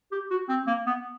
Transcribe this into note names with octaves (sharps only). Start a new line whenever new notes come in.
G4
F#4
C4
A#3
B3